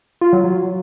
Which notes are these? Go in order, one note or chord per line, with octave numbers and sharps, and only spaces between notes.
F4
F#3
F#3